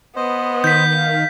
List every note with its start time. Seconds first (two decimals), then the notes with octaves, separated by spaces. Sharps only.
0.16 B3 B4 C5 D#5
0.64 D#3 G6 B6
0.96 F5